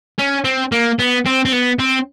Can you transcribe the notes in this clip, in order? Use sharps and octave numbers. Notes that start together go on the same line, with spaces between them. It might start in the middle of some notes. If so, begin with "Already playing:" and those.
C#4
C4
A#3
B3
C4
C4
B3
C4